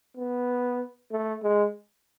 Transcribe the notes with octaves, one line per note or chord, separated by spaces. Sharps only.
B3
A3
G#3